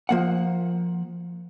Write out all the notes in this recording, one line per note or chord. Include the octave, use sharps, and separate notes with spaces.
F3 A#3 F#5